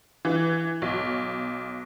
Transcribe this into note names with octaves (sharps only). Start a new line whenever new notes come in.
E3
B1